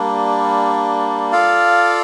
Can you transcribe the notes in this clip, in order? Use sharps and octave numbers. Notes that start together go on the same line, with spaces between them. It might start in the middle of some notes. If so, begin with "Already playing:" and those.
Already playing: G3 A#3 D4
F4 A4 D5 F5